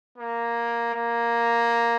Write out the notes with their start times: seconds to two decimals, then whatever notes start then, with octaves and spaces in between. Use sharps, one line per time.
0.18 A#3
0.95 A#3